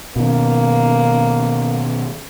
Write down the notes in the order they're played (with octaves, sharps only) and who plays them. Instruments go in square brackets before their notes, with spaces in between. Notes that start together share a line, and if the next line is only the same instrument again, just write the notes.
[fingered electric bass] B2 D#3 [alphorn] A#3